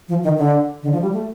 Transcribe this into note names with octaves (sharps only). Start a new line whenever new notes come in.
F3
D#3
D3
D3
F3
G3
A3